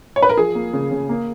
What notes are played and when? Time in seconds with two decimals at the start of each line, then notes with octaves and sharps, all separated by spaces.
0.16 C#5
0.22 B4
0.29 A#4
0.37 F3 G#4
0.55 A#3
0.73 C#3
0.91 C#3
1.09 A#3